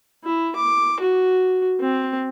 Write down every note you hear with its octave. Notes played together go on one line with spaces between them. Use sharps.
E4
D6
F#4
C4